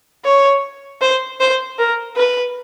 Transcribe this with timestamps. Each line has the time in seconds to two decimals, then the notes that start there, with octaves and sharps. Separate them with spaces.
0.25 C#5
1.01 C5
1.40 C5
1.78 A#4
2.16 B4